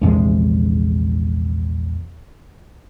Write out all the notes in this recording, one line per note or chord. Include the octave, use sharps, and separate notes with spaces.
A#1 E2 C3 G#3